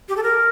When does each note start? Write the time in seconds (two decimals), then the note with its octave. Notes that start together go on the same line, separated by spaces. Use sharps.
0.09 G4
0.17 A4
0.23 A#4